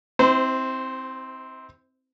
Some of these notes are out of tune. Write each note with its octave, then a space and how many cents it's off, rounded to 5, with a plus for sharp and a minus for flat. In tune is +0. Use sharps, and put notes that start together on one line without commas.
C4 +0 E4 -45 C5 -25